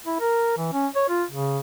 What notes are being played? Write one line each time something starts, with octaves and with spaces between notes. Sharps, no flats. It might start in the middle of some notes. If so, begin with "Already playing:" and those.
E4
A#4
E3
C#4
C#5
F4
C#3